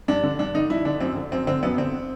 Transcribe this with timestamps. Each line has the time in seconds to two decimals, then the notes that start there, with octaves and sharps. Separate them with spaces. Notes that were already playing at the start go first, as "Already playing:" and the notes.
0.08 G2 D4
0.24 D3
0.39 G2 D4
0.54 D3 D#4
0.70 G2 E4
0.85 D3 D4
1.00 F#2 C4
1.16 D3
1.32 F#2 C4
1.47 D3 C4
1.63 F#2 B3
1.78 D3 C4